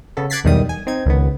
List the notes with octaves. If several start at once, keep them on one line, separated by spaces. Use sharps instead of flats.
C#3 B3 A4
D6 F#6 G#6 A6 B6 C7
B1 E2 D#3 G3 D#6
G#5
C4 D#4 G#6
C#2 D#3 B3